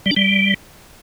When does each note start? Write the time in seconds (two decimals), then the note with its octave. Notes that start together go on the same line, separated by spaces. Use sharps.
0.06 G3
0.11 D4
0.16 G3